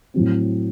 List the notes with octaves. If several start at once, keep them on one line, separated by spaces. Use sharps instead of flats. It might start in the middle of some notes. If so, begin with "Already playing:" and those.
A2 F#3 C4